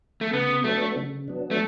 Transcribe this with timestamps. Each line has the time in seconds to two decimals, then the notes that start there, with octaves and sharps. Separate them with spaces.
0.21 A3
0.33 C#3 B3
0.64 F#3 A3 B3 D4
0.96 C#3
1.28 F#3 B3 D4
1.51 A3